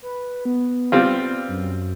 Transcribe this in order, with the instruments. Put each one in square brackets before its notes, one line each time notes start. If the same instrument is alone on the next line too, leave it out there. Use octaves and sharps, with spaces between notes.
[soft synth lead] B4
B3
[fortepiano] G3 C4 F4
[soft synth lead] F#2